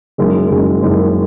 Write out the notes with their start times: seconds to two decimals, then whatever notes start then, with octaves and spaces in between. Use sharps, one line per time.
0.18 F#1 F#2 D#3 G#3
0.51 F#1 F#2 D#3 G#3
0.81 F#1 F#2 D#3 G#3